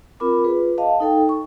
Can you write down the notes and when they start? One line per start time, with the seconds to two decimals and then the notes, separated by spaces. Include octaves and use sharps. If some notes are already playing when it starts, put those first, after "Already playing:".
0.20 C4 F4 A#4 B5 D6
0.44 F4 G#4 B4
0.78 D#5 F5 A5
1.00 D#4 A4 G5
1.29 C#6